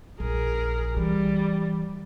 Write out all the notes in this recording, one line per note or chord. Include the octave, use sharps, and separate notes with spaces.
A#1 G#4 A#4
E3 G3